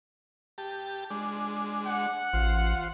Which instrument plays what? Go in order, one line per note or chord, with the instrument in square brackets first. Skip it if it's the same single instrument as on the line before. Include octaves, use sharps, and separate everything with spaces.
[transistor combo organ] G4 A5
G#3 D4
[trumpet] F#5
[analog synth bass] A1 [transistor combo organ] F4 C5